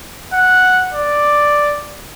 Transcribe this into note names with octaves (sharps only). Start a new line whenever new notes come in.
F#5
D5